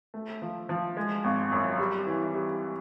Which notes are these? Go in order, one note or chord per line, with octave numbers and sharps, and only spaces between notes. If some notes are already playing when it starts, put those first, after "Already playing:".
A3
F3
F3
G#3
G#1
F#2
G3
E3
G3